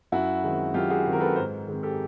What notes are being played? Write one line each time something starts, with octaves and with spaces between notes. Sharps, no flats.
F#2 E4 F#4
D#3 G#3 C4
F#2 F4 G4
F#4 G#4
D#3 G#3 C4
A#4
A4 B4
G#2 A#4 C5
D#3 G#3 C4
G4 A4